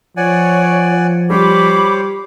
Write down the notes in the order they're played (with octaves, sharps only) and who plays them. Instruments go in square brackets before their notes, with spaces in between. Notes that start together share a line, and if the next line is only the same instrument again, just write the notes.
[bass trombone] F3 [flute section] C#5 [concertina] D5 F#5 G#5
[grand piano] G3 [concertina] C5 C#5 [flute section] B5 D6